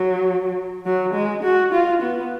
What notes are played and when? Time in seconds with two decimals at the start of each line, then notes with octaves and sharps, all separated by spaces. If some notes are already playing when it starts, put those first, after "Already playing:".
Already playing: F#3
0.85 F#3
1.14 G#3
1.44 F#4
1.73 F4
2.02 B3